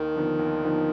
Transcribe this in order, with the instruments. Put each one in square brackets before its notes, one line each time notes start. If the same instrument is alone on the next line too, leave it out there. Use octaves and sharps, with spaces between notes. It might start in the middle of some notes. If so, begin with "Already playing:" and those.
Already playing: [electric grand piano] D#2 [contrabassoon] D#3
[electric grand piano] D3 F3 B3 D#4
D#2
D3 F3 B3 D#4